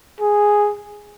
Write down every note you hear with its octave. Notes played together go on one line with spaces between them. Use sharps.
G#4